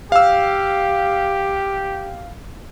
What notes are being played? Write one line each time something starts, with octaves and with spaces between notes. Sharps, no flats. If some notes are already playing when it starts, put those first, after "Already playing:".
G4 F5 E6